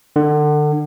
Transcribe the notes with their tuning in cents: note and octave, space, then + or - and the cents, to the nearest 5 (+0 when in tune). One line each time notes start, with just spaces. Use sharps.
D3 +30